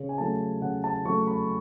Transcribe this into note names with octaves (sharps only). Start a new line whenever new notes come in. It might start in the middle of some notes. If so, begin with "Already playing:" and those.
Already playing: C#3
G#5
F#3 A3 A5
C#3 F#5
A5
F#3 A3 C#6
B5